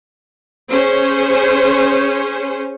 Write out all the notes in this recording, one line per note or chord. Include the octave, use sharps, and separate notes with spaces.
C#4 G#4 C5